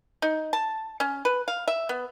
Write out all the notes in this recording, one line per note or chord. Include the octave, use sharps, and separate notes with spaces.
D#4
A5
C#4
B4
F5
E5
B3